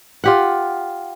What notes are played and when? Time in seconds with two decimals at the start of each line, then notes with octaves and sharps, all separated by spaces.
0.24 F4 G4 F#5